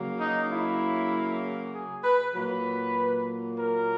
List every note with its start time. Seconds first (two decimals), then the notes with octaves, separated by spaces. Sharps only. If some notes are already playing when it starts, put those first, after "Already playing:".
Already playing: C#3 F#3 A#3
0.20 D#4
0.50 E4
1.74 G#4
2.04 B4
2.35 A#2 F#3 A#3 B4
3.58 A#4